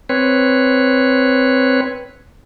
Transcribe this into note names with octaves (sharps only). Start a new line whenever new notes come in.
C4 B4 C#5